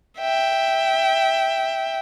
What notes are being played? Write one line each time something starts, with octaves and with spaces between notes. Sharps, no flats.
E5 G5